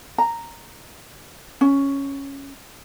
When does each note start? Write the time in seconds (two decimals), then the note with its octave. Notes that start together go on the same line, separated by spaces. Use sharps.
0.18 A#5
1.61 C#4